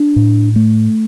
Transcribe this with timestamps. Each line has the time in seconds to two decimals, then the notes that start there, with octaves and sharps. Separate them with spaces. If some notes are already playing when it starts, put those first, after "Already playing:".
Already playing: D4
0.16 A2
0.56 A3